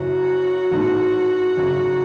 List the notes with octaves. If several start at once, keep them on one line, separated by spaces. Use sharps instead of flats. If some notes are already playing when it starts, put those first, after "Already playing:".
Already playing: F#1 F#2 E3 F#4
A1 G#2 D#3 A3
G#1 F#2 C#3